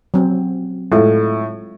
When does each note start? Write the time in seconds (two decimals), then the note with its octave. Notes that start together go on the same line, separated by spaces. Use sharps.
0.14 F#3 C4
0.92 A2 G#3 F4